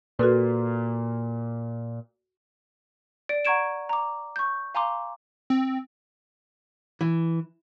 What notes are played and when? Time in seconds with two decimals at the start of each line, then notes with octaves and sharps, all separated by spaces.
0.19 A#2 F#4 A4 B4
3.29 D5 D7
3.45 F#5 A#5 C#6 G#6 D7 E7
3.89 A#5 D6
4.36 C#6 G6
4.75 F5 G#5 A#5 C6 D6
5.50 C4
7.01 E3